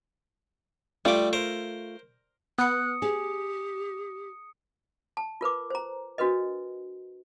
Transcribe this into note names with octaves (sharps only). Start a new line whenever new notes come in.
G3 A3 F4 D6
A#4 C5
B3 D#6 F#6 C#7
G4 G#4
A5
F4 A#4 B4 D6
C5 A#5
D4 F#4 A#4 B4 D#5